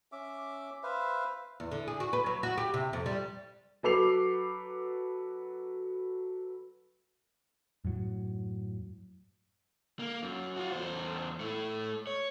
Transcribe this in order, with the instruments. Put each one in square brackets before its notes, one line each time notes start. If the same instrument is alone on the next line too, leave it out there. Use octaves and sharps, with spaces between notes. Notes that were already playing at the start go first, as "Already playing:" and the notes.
[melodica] C#4 E5 D6
B4 C5 E5 F5
[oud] E2
D3
G#4
F#4
B4
F#3
F#4
G4
C3
F2
G3
[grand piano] F#3 A4 B4 D6 C7 F7
[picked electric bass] F#2 A2 F#3
[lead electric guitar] A#3
F#2
F4 F#4
E2 C5
A3 E4
C#5